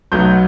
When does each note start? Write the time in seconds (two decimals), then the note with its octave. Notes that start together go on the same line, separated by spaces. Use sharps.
0.12 B1 B2 F#3 A3 G6